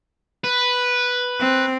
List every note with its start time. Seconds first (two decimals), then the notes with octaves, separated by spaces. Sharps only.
0.44 B4
1.40 C4